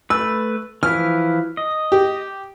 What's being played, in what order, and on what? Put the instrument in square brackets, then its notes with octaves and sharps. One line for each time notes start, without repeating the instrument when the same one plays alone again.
[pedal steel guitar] A3 B4 [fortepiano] E6
[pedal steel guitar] E3 F3 E4 [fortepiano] F6
[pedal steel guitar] D#5
[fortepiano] G4